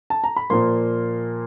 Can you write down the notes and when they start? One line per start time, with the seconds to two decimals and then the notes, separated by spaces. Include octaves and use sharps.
0.10 A5
0.24 A#5
0.36 B5
0.50 A#2 F3 A#3 C6